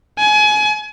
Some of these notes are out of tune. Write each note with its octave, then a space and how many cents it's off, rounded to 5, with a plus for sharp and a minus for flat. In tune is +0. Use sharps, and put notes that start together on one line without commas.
G#5 +30